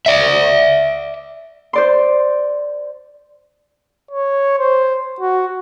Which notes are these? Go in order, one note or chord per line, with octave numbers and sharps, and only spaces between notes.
D5 E5
C5 D5 C6
C#5
C5
F#4